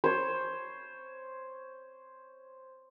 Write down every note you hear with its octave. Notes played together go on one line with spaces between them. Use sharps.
C5 C#5